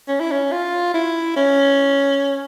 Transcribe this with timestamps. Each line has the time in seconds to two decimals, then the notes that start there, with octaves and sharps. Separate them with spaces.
0.08 C#4
0.20 E4
0.31 C#4
0.52 F4
0.94 E4
1.36 C#4